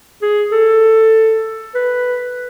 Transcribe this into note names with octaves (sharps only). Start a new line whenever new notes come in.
G#4
A4
B4